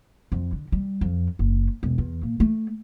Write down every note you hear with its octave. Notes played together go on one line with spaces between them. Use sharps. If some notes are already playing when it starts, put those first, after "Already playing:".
F2
D3
G3
F2
F#1
E1
E2
A#2
A3